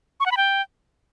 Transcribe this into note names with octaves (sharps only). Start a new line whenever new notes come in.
C#6
F#5
B5
G5